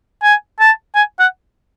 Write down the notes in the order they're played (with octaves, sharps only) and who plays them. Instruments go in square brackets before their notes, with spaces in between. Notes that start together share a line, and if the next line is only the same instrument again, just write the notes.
[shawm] G#5
A5
G#5
F#5